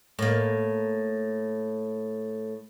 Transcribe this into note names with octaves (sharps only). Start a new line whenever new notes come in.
A2 A#3